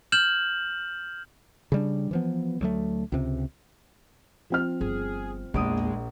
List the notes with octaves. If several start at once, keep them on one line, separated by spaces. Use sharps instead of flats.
F6 G6 E7 F#7
C#3 G3 D4
E3 F3 B3
D2 F#3 A3
C#2 C3
F3 C4 F6
G1 G#4
A#1 E2 G#3 A#3 D6 D#6